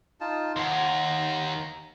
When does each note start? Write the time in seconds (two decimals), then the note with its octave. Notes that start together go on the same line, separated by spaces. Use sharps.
0.21 D#4 F4 A5
0.56 D#2 F#5 A#5 C6